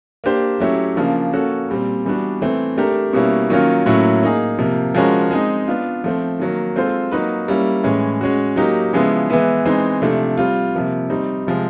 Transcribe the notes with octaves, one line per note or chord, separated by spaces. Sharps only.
A#3 D4 G4 C5
F#3 A3 C#4 E4 G4
C#3 F3 A#3 D4
A#3 C#4 F#4 A4
A#2 G3 C4
E3 G3 B3 D4 F#4
E3 A3 C4
A3 D4 G4 A#4
B2 G3 A#3 C#4 E4
D#3 F#3 A#3 C#4 F4
A2 F#3 A#3 C#4 E4
A#3 D#4 G#4
C3 F3 A#3
F3 G#3 C#4 F#4 A#4
G#3 C4 D#4
B3 D4 F4
F3 A3 C4
D#3 F#3 A#3
G#3 C4 F4 A4 C5
F#3 A#3 D#4 F#4 B4
G3 A#3 C#4 E4
A2 E3 G#3 C#4
G#3 C#4 F#4
F#3 A#3 D#4 G4
C#3 F3 G#3 B3 E4
E3 G#3 B3 E4
E3 G#3 C4 D#4
C3 F3 A3 D4
G3 C4 F4
C3 F3 A#3
G3 C4 D#4
C3 F3 G#3